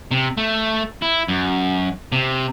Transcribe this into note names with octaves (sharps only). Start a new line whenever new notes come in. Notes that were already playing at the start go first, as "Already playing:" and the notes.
C3
A3
E4
F#2
C3